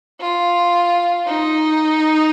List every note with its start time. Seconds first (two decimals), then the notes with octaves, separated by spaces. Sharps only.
0.20 F4
1.27 D#4